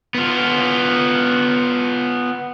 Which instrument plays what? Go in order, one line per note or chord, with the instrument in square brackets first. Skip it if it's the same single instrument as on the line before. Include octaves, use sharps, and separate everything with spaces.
[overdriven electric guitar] B3 F4